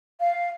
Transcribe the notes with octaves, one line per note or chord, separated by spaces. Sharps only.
F5